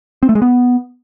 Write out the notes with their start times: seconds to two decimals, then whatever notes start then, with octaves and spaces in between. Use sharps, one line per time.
0.23 C4
0.29 A3
0.35 G#3
0.42 B3